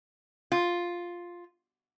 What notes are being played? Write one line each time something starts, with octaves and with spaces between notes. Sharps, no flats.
F4